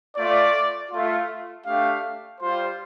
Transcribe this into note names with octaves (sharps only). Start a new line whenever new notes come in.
A3 F4 D5
A3 F4
A3 D4 G4 F5
G3 F4 C5